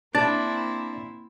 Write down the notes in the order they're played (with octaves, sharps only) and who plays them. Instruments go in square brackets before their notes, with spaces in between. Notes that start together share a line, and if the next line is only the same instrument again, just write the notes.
[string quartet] A#3 C4 E4 [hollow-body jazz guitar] D4 [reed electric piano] A6